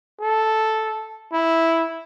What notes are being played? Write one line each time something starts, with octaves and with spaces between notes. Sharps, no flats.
A4
E4